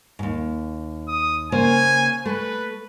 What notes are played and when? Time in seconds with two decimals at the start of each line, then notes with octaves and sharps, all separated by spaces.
0.19 D#2 G#2
1.08 D#6
1.52 C#3 A#3 C5 G#5
2.26 A3 B4